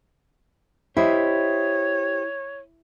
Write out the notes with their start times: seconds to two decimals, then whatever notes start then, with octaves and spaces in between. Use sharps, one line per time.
0.97 E4 G4 C5 C#5 D#5